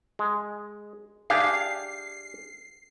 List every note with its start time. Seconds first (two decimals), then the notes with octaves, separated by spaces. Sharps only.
0.19 G#3
1.30 D4 G4 G#4 F5 C7